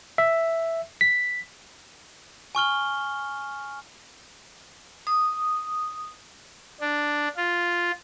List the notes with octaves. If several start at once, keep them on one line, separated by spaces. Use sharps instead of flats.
E5
B6
G#5 C#6 F6 G7
D#6
D4
F4